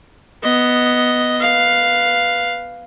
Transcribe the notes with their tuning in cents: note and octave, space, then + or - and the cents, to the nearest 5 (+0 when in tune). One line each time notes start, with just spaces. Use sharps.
B3 +0 D#5 +0
B4 +0 F5 +0